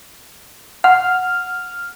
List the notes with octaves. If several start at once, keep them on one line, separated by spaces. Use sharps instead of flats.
F#5 F6